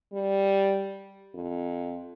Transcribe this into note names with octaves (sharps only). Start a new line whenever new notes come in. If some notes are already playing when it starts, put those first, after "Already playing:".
G3
F2